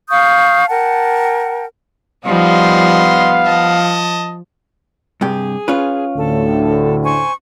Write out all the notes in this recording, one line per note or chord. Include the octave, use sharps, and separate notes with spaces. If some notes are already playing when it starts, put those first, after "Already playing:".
F5 C#6 D#6 G6
A#4 F#5 G5 A5
F3 G3 B3 D#4 D#5 F5 C6
F3 D#5 A5
G2 C3 G4 G#4
C#4 F4 B4
D2 A2 D3 A4
C5 G#5 C#6